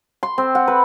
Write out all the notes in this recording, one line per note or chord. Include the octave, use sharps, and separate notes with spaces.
C6
C4
F#5
B4